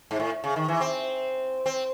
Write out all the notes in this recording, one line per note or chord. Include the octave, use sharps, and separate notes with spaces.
G#2
A2
C#3
D#3
E3
C4
C4